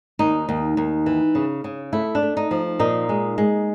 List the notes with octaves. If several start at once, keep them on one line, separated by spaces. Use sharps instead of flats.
D#2 D#4
D#2
D#2
E3
C#3
C#3
A3 E4
D4
A3
D#4
F3
A#2 D#4
G#3
G#3